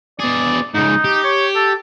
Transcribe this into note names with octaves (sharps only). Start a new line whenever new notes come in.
B2 G#4 D5
G#2 C#3 D#4
G4
C#5
A4